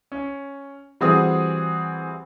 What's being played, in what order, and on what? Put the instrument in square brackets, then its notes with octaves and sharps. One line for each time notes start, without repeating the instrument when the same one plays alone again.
[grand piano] C#4
E3 G3 C4 F#4 G#4 D#6